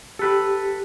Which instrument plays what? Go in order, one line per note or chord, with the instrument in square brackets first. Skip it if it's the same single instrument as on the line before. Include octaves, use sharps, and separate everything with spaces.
[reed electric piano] G4 [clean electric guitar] A4 B4